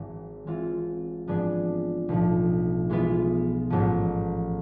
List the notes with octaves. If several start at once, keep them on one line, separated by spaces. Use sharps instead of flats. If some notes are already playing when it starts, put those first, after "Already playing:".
Already playing: G#1 G#2 E3
E3 G#3 C4 F4
G#2 F3 B3 D4 G#4
B1 A2 F3
E3 G#3 B3 F4
A1 G#2 F3